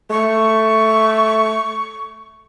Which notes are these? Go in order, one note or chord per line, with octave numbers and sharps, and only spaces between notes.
A3 C#6